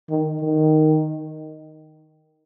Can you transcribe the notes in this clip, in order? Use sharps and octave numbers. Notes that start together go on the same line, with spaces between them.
D#3
D#3